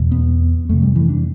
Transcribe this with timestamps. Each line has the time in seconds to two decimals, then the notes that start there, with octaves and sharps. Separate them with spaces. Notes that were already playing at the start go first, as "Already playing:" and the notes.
Already playing: E2 B2
0.12 B3
0.69 F2 C3 A3
0.82 G3
0.96 E3
1.09 D4